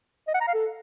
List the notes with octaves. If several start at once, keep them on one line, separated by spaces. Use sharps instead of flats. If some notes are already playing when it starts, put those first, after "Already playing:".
D#5
F#5
A#5
F5
A4